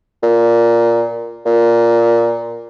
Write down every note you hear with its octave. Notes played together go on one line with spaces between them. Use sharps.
A#2
A#2